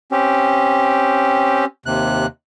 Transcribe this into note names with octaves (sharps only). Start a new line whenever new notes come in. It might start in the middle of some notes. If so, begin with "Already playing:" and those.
C4 C#4 G4
D#2 C3 F#6